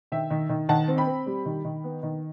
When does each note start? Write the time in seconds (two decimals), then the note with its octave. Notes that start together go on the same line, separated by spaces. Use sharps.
0.12 D#3 E5 G5
0.30 D#3
0.49 D#3
0.69 D#3 F#5 A5
0.88 C4
0.97 G5 B5
1.07 C4
1.26 G3
1.46 D#3
1.65 D#3
1.84 B3
2.03 D#3